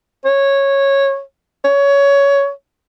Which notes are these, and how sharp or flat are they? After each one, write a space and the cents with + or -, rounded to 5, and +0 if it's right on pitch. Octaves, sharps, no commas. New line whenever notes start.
C#5 -10
C#5 +15